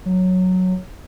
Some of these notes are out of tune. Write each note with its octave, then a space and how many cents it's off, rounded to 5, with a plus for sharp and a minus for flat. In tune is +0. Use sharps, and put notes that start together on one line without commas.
F#3 -5